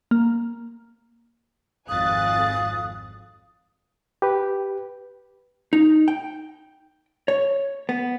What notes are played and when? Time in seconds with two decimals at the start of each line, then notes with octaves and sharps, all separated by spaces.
0.11 A#3
1.89 G#1 F2 F5 G#5 D#6 F#6 A6
4.22 G4 B4
5.73 D#4
6.08 G5
7.28 C#5
7.89 B3